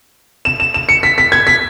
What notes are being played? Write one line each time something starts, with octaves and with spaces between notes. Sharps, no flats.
E7
E7
E7
C#7
B6
B6
G#6
B6